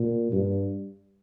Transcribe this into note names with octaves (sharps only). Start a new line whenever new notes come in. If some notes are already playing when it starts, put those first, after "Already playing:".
Already playing: A#2
G2